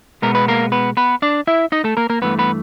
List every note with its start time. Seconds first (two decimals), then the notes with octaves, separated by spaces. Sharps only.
0.22 B2 G#3 B3 A#4
0.35 B4
0.48 A#3 A#4
0.72 B3 B4
0.97 B3 B4
1.22 D4 D5
1.47 E4 E5
1.72 D#4 D#5
1.84 A3 A4
1.97 A#3 A#4
2.10 A#3 A#4
2.22 G2 E3 A3 B3 B4
2.39 B3 B4